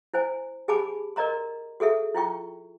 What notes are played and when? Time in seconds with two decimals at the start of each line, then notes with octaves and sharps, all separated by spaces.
0.14 E4 C5 G#5
0.68 G4 G#4 G#5 A5 B5 D6
1.16 A#4 D5 D#5 A#5 C6
1.80 F#4 G#4 A4 E5
2.15 E4 F4 G5 C#6